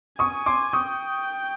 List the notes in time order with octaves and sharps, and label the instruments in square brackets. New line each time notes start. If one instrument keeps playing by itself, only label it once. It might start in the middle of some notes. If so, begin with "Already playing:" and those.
[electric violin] G#5 [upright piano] C#6 D#6
[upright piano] C6 D6
[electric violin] G5 [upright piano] C#6 D#6